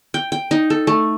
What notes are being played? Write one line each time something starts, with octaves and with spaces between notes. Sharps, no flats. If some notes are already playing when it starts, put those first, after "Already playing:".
G5
G5
D#4
A4
A3